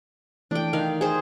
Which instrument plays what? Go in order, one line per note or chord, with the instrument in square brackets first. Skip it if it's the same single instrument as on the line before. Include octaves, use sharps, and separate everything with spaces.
[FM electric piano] E3 A3 D5 [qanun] D4 G5
[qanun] D#3 F5
G#4 C5